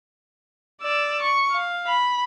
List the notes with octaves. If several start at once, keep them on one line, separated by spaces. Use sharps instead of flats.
D5 E6
C#6
F5
B5